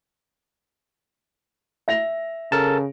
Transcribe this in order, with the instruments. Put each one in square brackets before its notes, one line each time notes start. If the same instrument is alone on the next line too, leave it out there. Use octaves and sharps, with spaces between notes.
[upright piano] E5 A#6 F7
[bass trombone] C#3 [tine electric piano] A4 A#4 A5